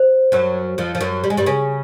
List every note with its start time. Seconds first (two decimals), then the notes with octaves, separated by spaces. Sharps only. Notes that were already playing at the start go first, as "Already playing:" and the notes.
Already playing: C5
0.32 F#2 F#3
0.78 F2 F3
0.95 F3
1.01 F#2 F#3
1.24 G3
1.30 G#3
1.37 G2 G3
1.46 C#3 C#4